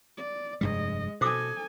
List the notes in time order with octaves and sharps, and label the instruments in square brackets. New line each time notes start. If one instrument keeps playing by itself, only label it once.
[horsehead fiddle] D5
[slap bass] F1 G2 G3 [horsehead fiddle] G#3 D#5
[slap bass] B2 [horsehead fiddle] A4 G#5 [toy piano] C5 D6 D#6